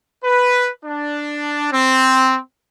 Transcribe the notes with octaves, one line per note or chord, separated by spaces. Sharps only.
B4
D4
C4